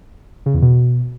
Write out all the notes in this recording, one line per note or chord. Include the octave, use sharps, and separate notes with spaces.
C#3
E2
B2